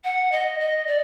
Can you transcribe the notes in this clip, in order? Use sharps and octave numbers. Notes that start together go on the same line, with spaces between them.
F#5
D#5
D#5
D5